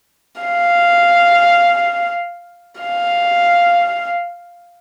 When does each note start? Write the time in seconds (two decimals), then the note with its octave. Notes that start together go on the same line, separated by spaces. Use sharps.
0.41 F5
2.81 F5